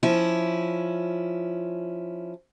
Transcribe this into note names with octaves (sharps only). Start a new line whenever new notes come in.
F3 C#4 E4